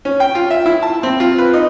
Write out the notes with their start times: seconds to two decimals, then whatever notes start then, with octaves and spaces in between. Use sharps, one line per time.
0.05 C#4
0.20 G5
0.35 F4
0.51 E5
0.66 E4
0.83 A5
1.03 C4
1.20 F4
1.38 B4
1.54 D#4